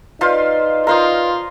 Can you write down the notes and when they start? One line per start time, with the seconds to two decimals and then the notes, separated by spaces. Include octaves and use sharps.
0.21 D#4 F4 B4 C5 D5 F5
0.87 F4 A#4 C5 D#5